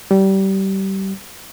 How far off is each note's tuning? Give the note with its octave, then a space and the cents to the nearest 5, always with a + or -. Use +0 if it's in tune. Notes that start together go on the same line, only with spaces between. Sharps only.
G3 -25